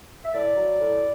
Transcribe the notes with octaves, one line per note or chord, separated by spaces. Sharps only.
E5
A2 D5
F#3
A2